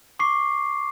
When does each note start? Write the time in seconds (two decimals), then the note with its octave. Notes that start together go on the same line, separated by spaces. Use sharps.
0.19 C#6 D6 C7